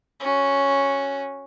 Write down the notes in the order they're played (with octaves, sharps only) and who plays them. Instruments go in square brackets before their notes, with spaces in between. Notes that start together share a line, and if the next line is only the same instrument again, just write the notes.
[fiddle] C#4 F#4